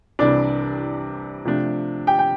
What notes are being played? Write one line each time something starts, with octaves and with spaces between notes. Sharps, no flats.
C2 C3 E3 G3 D4 D5
C3 F3 A3 D4
G4 G5
G5